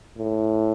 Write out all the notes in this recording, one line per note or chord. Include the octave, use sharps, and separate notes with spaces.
A2